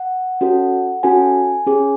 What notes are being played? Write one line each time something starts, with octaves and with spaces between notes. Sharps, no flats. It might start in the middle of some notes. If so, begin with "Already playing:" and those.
Already playing: F#5
C#4 F#4 A4
C#4 F#4 A4 G#5
C#4 G#4